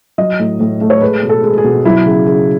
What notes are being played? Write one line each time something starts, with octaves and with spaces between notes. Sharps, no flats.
F#3 D#5
A2
A2
A3
C#5
G#3 B4
B2
A4
G#3
G#4
B2
F#3 E4
C#3
C#3